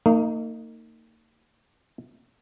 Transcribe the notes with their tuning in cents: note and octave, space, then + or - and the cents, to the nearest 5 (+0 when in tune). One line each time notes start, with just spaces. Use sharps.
A#3 -40 D#4 +0